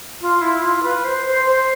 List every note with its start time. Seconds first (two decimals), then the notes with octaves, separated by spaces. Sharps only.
0.21 F4
0.41 E4
0.62 F4
0.83 B4
1.04 C5
1.25 C5
1.46 C5